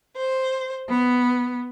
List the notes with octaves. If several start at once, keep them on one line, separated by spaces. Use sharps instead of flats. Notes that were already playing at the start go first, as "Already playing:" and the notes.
C5
B3